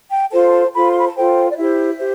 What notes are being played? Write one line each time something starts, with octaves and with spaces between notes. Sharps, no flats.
G5
F4 A4 C5 A5
A5
F4 A4 C5 B5
C6
B5
A5
F4 A4 C5 G5
D5
E4 G4 C5 E5
G4 C5